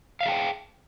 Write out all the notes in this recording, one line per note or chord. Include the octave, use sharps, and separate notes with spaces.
G#4 E5 F5 G5